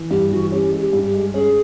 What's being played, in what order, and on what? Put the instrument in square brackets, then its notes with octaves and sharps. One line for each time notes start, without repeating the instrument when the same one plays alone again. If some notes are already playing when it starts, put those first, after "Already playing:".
Already playing: [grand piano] E3
[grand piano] G2 [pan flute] G4
[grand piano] E3 [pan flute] F#4
[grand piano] C#4 [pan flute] G4
[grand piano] G#3
[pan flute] G4
[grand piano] G2
[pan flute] G4
[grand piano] G#3
[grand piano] C#4 [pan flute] G#4